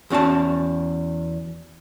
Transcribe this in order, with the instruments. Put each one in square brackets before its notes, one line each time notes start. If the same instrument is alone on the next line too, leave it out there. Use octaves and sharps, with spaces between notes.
[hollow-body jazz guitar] E2 C#4 F#4 D5 A5